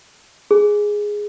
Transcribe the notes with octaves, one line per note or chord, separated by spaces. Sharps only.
G#4